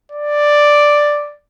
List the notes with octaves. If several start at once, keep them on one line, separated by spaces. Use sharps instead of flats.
D5